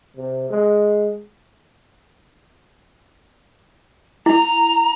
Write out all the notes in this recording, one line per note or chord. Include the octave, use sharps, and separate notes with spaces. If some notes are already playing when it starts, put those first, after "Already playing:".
C3
G#3
E4 A#5